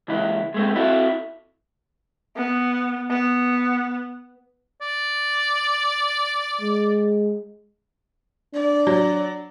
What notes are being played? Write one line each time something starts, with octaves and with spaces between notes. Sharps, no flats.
C#2 E3 E4
G#3 A3 C4
C4 E4 F#4 A4
B3
B3
D5
G#3
D4 D5
F#3